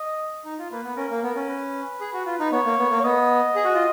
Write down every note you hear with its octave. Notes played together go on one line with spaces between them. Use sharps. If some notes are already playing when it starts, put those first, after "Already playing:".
Already playing: D#5
D#4
F4
A#3 B4
B3
C#4 A#4
A#3
B3
C#4
B4
G#4
F#4
F4
D#4
B3 C#5
A#3
B3
A#3
C#5
B3 D#5
G#4
F#4
F4